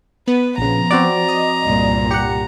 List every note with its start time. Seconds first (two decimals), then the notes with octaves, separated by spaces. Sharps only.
0.27 B3 B4
0.58 A#1 C#3 F3 A#5
0.91 C4 F#4 D5
1.28 D#5
1.62 C2 G2 A#2
2.11 G4 F#5 C#7